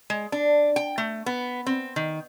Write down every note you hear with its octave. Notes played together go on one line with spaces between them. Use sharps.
G#3
D4
G5
A3
B3
C4
D#3